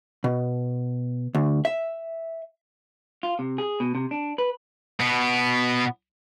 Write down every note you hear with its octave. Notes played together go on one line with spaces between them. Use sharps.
B2
D2
E5
F4
C3
G#4
B2
C3
D4
B4
B2 B3